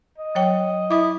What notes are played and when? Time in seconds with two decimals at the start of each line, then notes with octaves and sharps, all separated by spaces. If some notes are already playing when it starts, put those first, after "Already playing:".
0.18 D#5
0.35 F#3 C#5 G5
0.91 E4 D6 D#6